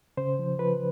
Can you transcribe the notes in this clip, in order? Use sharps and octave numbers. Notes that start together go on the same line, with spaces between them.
C#3 C5
F3
F3 B4